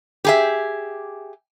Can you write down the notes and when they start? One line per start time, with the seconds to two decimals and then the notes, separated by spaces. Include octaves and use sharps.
0.25 G4 G#4 E5